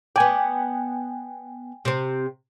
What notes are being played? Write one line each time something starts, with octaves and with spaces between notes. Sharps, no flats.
B3 D5 G5 G#5
C3 C4